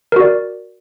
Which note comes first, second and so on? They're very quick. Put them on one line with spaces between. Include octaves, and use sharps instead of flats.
A#4 F#4 D5